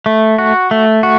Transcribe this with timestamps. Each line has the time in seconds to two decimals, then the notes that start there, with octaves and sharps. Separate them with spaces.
0.06 A3
0.38 F#4
0.71 A3
1.03 F#4